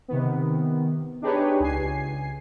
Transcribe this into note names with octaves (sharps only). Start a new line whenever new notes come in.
C3 D#3 B3
D4 D#4 G4 G#4 B4 C#5
C#2 G#5 C7